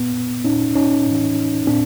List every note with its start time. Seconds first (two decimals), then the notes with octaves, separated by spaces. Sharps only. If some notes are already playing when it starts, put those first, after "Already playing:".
Already playing: A#2 B3
0.45 A#2 C#4 D#4
0.75 C#4 D#4
1.06 A2 E3
1.67 A#2 C4 D4